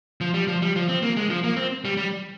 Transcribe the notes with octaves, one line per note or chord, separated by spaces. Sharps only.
F3
G3
F3
G3
F3
C4
A#3
G#3
F3
A#3
C4
G3
G3